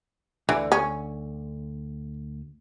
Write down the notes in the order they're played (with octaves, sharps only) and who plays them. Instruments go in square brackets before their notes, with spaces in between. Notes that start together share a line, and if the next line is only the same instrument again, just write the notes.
[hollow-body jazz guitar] D2 D3 [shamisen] E3
[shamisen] C#4